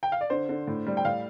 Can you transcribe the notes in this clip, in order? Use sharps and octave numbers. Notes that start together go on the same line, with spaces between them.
G5
F5
D5
D3 C5
D3
A2
G3
G5
A2 F5